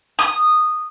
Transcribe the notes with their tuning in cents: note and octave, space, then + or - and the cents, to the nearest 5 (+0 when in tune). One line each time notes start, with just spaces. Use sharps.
D#6 -10